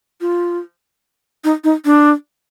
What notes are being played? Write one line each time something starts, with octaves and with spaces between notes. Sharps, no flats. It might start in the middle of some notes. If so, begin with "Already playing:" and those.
F4
D#4
D#4
D4